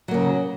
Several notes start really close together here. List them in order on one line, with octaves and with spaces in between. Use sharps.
F#3 A#3 C#3